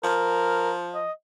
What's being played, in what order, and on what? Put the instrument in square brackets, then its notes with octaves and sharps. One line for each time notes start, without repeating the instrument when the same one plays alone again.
[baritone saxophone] F3 [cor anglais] A#4
[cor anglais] D#5